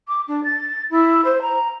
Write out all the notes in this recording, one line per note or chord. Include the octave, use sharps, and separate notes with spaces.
D6
D4
A6
E4
C5
A#5